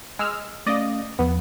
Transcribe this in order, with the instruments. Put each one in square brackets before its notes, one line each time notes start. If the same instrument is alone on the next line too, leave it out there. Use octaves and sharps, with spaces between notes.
[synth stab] G#3 E6 F6
[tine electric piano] A3 C#4 F5 [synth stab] D5 D#5
[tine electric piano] E2 F3 [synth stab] B3